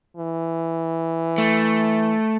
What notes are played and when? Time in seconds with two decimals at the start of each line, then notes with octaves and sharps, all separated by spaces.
0.17 E3
1.38 A3